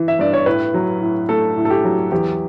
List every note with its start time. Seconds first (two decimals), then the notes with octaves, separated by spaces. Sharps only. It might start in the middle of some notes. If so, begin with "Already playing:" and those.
Already playing: E3
0.08 E5
0.19 G2 D5
0.33 C#5
0.46 A2 B4
0.74 F#3
1.02 A2
1.29 A3 A4
1.57 A2
1.65 A4
1.70 G4
1.84 F#3
2.12 E2 G4